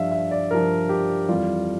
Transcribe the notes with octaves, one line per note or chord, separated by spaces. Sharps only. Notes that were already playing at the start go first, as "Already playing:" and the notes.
Already playing: G2 F3 E5 F5
E5
D5
G2 F3 A#4
G4
F2 E3 G3 F4